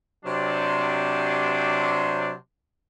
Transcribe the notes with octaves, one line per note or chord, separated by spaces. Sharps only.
C3 F#3 D4